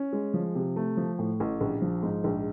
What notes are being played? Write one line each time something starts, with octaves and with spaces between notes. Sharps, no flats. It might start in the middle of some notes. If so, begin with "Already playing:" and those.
Already playing: C#4
G#3
F3
C3
A3
F3
A2
A1
A#1
F3
G#2
A#1